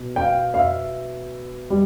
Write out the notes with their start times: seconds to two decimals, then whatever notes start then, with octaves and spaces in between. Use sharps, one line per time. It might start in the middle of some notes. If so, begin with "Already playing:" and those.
Already playing: B2
0.16 G5
0.21 F5
0.54 F5
0.59 E5
1.70 G3